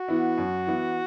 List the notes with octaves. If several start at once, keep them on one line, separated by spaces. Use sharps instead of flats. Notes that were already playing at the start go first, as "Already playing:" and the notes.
Already playing: F#4
E3 B3 E4
F#2
E3 B3 E4